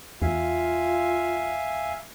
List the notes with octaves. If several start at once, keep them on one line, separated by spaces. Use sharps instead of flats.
E2 F4 E5 F5 G#5